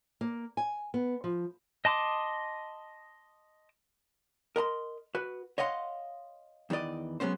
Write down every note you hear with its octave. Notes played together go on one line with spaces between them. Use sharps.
A#3
G#5
B3
F3
D#5 A5 C6 D6 D#6
A#4 D#5 A#5 C6
F#4 B4
C#5 D#5 F5 F#5 B5 C6
E2 D#3 E3 D5 D#5
F#3 G#3 B3 C#4 C5